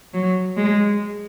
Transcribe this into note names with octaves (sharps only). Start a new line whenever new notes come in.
F#3
G#3